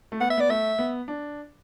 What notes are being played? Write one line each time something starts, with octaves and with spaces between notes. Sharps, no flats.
A3
B3 F#5
E5
B3 D5
A3 E5
B3
D4